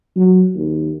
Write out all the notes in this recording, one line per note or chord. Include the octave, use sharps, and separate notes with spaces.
F#3
D#2